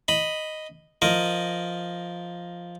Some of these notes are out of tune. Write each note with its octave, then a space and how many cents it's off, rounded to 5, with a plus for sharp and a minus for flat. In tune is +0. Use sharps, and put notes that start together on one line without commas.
D#5 +0 B5 +0
F3 +0 A#4 +0 D#5 +0